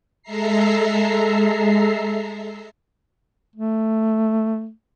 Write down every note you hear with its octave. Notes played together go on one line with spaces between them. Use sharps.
G#3 A4 E5 A#5 C7
A3